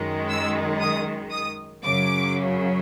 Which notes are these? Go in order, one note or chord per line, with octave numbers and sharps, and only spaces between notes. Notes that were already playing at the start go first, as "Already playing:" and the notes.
Already playing: F#2 D#3 G#3
E6
D#6
D#6
F#2 C#3 F#3 D6